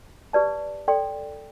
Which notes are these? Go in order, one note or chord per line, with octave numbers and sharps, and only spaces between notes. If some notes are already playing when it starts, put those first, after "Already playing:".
G4 B4 D5 A5
A4 D5 G5 C6